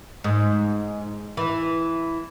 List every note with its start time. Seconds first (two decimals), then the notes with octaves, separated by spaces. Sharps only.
0.24 G#2
1.37 E3